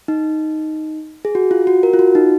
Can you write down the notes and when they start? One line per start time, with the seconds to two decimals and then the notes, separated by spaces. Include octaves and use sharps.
0.08 D#4
1.25 G#4
1.35 F#4
1.51 F4
1.67 F#4
1.83 A#4
1.93 F4
1.99 F#4
2.15 D#4